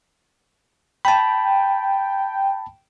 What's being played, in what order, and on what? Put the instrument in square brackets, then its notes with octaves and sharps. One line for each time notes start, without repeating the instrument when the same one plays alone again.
[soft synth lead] G5 [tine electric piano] A5 B5